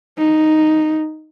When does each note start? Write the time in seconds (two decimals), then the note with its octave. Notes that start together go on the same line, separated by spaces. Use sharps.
0.18 D#4